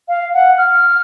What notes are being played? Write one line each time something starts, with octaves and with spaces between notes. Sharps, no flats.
F5
F#5
F6